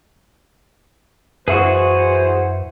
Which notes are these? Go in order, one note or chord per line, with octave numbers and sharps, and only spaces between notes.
F#2 E3 F#4 G#4 B4 C5 E5 F#5